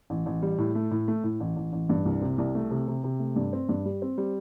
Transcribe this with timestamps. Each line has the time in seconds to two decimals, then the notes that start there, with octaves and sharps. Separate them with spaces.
0.10 A1
0.26 A1
0.42 G3
0.58 A2
0.75 A3
0.91 A2
1.08 A3
1.24 A2
1.40 A1
1.56 A1
1.73 A1
1.89 G2
2.06 C2
2.22 C3
2.38 C2
2.55 A3
2.71 C3
2.88 C3
3.04 C3
3.20 A3
3.36 G2
3.53 C4
3.69 G2
3.86 G3
4.02 C4
4.18 G3